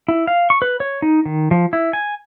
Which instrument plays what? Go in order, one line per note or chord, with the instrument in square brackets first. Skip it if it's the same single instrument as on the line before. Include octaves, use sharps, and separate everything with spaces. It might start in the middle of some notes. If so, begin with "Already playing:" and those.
[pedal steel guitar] E4
F5
C#6
B4
C#5
D#4
D#3
F3
E4
G#5